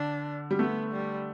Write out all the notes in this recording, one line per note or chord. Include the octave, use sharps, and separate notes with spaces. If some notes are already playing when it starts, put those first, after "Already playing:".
Already playing: D3 D4
G3
A3 B3
G3